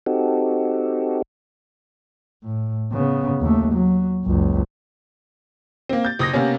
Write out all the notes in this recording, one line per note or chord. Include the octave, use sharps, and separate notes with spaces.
C4 D#4 F#4 G4 A4
A2
C#3 B3
D#2 A3
F#3
F#1 C#2
A#3 C4
G6 A6
F#1 D#6 A#6
C3 A#3 B3 C#4